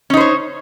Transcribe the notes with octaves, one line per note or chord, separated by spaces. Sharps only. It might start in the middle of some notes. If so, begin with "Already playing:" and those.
C#4 D#4 C5 C#5